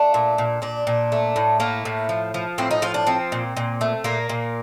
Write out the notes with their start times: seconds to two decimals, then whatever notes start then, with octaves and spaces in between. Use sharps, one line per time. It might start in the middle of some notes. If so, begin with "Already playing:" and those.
Already playing: A3 D4
0.14 A#2
0.38 A#2
0.62 A#2 D4
0.87 A#2
1.12 A3
1.36 A2
1.60 A3 A#3
1.85 A2
2.09 F3
2.34 F3
2.58 A2 C4
2.71 D#4
2.82 F3 F4
2.94 D4
3.07 F3 C4
3.32 A#2
3.57 A#2
3.81 A3
4.04 A#2 A#3
4.29 A#2